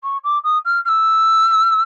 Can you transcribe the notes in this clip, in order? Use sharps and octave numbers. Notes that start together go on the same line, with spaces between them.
C#6
D6
D#6
F6
F6
E6